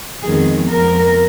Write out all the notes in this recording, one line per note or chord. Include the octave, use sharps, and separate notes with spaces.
F2 D#3 G#3 B3 G#4
F2 F3 B3 A#4